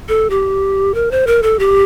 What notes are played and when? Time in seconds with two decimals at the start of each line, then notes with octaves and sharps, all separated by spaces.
0.09 A4
0.30 G4
0.94 A#4
1.11 C5
1.27 A#4
1.43 A4
1.59 G4